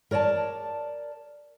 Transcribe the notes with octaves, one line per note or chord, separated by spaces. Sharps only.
A#4 C#5 D5 G#5 A5